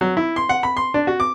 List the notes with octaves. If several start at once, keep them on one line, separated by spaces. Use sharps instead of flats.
F#3
E4
C6
F#5
B5
C6
D4
F#4
D6